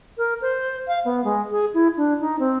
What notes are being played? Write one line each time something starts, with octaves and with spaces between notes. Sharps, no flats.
A#4
C5
F5
B3
G#3
G#4
E4
D4
D#4
C4